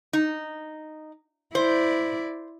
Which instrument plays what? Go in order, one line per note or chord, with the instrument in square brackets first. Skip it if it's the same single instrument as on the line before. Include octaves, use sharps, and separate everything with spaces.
[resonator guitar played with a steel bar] D#4
[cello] E4 D5 [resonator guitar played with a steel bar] C5